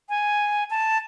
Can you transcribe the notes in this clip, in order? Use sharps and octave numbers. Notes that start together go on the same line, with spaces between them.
G#5
A5